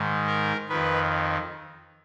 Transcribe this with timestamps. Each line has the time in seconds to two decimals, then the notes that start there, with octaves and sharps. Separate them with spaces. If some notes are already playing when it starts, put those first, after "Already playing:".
Already playing: G#2 D#3
0.27 A#4
0.69 F2 D#3 B4